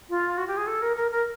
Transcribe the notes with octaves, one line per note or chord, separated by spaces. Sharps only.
F4
F#4
G4
G#4
A4
A#4
A#4
A#4